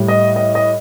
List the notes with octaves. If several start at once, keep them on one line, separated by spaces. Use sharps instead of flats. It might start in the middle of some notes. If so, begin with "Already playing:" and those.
Already playing: A2 G3
D#5
D#5
D#5